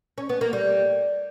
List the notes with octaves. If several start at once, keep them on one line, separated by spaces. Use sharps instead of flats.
C#4
B3
A#3
G3